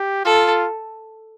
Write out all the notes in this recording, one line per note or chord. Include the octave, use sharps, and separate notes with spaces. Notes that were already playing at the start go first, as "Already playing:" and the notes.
Already playing: G4
F4 A4